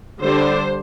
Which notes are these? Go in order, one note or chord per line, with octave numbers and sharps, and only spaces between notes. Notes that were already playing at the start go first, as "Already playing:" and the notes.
D3 G3 D4 C5